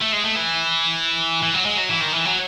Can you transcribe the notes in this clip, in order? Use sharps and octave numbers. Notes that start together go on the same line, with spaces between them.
A3
G#3
A3
E3
E3
F#3
G#3
F#3
E3
D#3
E3
F#3